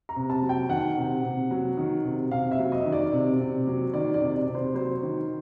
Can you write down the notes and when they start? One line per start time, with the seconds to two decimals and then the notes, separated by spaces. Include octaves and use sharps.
0.09 A#5
0.16 C3
0.30 A5
0.42 F#3
0.49 G5
0.69 D#3 F#5
0.97 C3
1.23 C3
1.51 F#3
1.77 D#3
2.05 C3
2.31 C3 F5
2.51 E5
2.59 F#3
2.72 D#5
2.86 D#3
2.92 D5
3.13 C3
3.40 C3
3.67 F#3
3.94 D#3 D5
4.14 D5
4.21 C3
4.35 D5
4.47 C3
4.55 C5
4.74 F#3 C5
5.02 D#3